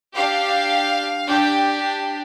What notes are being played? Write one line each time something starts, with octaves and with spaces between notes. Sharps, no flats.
D4 G4 F5
D4 G4 G5